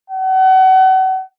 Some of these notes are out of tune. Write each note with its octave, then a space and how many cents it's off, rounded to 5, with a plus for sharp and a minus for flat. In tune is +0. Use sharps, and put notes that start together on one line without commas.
F#5 +35